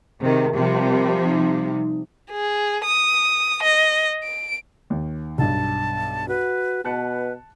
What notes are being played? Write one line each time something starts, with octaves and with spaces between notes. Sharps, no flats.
C3 D#3 G#4 A#4
C3 F3 G3 G4 A#4 G5
D#4
G#4
D#6
D#5
D7
D#2
B1 G2 A5
F#4 B4
B2 B4 A5 F#6 C#7